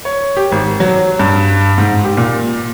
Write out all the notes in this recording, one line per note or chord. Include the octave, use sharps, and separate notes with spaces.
C#5
G4
G#1
F#3
G2
G#2
G4
A#2